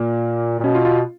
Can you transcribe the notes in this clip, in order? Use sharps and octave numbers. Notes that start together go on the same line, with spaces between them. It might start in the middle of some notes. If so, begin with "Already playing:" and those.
Already playing: A#2 A#3
A#2
B2 C#4
F4
F4